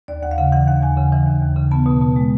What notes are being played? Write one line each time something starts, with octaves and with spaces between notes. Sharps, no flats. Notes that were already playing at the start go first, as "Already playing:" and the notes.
D#2 D5
D#2 F#5
F5
C#3 F#5
E3 F#5
D#2 F#5
D#2 G#5
C#3
E3
D#2
D#2
C#3
B3 A5
B2
B2
G#3